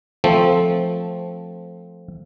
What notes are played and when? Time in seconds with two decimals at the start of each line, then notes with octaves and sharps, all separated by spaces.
0.24 F3 A3 C4